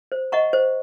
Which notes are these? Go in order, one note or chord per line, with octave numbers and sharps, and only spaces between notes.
C5
D#5 F#5 A#5 C#6
C5